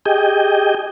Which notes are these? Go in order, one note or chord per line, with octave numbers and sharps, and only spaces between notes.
G4 G#4 D#5 G5